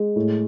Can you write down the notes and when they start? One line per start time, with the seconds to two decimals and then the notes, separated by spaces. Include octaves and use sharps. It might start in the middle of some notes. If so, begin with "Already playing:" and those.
Already playing: G#3
0.16 A2